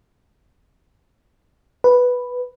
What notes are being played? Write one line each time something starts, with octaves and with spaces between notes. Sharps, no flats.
B4